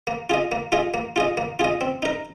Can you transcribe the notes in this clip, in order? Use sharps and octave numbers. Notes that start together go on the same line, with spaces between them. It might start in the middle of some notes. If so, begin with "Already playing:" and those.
A#3
F4 G#4 D#5
A#3
F4 G#4 D#5
A#3
F4 G#4 D#5
A#3
F4 G#4 D#5
C4
D#4 A#4